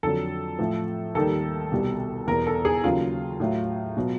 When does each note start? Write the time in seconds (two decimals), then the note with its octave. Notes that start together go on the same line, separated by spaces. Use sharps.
0.03 F2 D3 F#3 A4
0.59 A2 F3
1.15 D#2 D#3 G3 A4
1.72 C2 B2 G3
2.27 E2 B2 G3 A#4
2.47 A4
2.65 G#4
2.84 D#2 C#3 F#3 F4
3.40 A2 F#3
3.97 B2 F#3